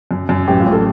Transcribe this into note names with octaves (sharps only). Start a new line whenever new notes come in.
F#2
F#2
A1 G4
F4
A1
A4